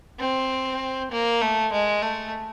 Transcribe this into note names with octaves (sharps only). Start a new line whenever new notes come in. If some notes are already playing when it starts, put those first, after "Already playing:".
C4
A#3
A3
G#3
A3